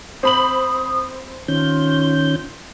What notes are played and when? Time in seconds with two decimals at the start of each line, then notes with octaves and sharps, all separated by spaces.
0.23 C4 B5 D#6 F#7
1.48 D#3 C#4 F4 G6